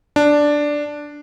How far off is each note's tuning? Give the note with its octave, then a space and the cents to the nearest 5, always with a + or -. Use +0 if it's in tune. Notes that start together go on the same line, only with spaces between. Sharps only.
D4 +0